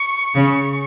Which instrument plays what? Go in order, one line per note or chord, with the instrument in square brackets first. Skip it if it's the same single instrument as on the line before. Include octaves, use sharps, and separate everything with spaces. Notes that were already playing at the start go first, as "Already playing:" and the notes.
Already playing: [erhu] C#6
[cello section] C#3